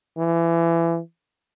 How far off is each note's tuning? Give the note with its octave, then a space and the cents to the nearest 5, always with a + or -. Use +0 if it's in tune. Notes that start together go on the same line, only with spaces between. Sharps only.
E3 +25